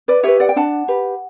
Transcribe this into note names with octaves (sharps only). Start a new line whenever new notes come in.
B4 D5
G4 B4 C#5 E5
D5 F#5
G5
D4 F#5 A5
G4 B4